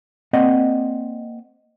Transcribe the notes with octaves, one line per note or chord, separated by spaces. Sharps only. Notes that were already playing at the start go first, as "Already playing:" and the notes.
A#3 C4 D5 D#5 F#5